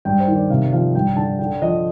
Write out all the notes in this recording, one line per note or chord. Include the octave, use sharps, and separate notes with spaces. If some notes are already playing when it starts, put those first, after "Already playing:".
G2 G5
C5
D#3
D5
C3 F5
F3 F5
G2 G5
D3 A5
D3 G5
F3 D#5